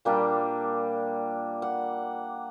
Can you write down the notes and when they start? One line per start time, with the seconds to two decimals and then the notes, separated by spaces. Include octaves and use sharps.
0.05 A#2 G3 A#3 D4 G5
1.62 F#5